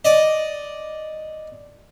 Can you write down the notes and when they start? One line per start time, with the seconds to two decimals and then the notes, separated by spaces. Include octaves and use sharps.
0.05 D5 D#5